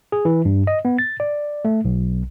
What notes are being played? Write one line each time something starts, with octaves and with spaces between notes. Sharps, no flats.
G#4
E3
G2
D#5
B3
A6
D5
A3
B1